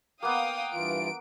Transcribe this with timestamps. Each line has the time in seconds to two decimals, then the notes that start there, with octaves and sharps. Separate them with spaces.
0.23 A#3 B3 F5 G5 D#6
0.73 G2 E3 F4 D7